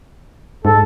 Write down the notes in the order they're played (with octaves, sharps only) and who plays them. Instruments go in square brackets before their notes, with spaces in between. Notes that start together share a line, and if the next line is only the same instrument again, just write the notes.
[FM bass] G#2 [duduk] A4